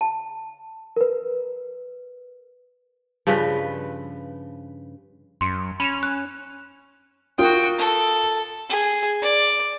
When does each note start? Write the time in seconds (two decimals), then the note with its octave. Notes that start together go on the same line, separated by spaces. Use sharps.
0.01 A5
0.96 A#4 B4
3.27 G2 C#3 F3 B4
5.41 F#2 C6 C#7
5.80 C#4 B5 E7 F7
6.03 F#6
7.38 F4 F#4 A#4 G5 D#6
7.78 A4
8.70 G#4
9.22 D5